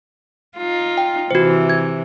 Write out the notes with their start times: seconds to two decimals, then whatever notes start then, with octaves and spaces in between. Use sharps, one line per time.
0.57 D#4 F4
0.98 G5
1.31 C3 E3 F#4 C5
1.69 G#6